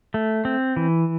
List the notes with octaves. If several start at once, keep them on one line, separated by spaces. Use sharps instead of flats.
A3
C4
E3